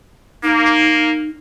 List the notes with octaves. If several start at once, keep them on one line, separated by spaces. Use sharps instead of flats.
A#3 D#4